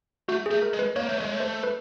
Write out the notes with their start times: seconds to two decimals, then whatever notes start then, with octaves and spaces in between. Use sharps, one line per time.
0.28 A3 F#4
0.46 G#4
0.51 A3
0.62 A#4
0.73 G#3
0.79 B4
0.96 A#3 C#5
1.09 A3
1.18 G#3 C#5
1.33 A3
1.40 C5
1.63 B4